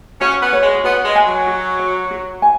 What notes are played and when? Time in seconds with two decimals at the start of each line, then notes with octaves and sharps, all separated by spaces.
0.21 C#4 F#4
0.42 B3
0.53 C#5
0.63 G#3
0.84 B3 F#4
1.05 G#3
1.16 G#5
1.27 F#3
1.47 F#4
1.79 C#5
2.11 F#4
2.42 G#5